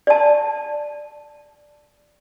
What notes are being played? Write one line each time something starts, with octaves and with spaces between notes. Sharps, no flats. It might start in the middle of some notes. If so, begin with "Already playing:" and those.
D5 A5